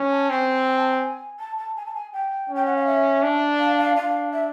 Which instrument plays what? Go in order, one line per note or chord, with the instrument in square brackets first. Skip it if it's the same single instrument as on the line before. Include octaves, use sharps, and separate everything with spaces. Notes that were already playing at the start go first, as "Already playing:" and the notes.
Already playing: [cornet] C#4
[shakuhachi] A5
[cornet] C4 [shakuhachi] G#5
[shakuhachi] G#5
A5
G#5
A5
A5
G#5
A5
G#5
G5
[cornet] C#4
[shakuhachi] G5
F#5
F5
E5
[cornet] D4
[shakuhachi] F5
F5
[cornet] D4 [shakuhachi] F5
[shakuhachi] E5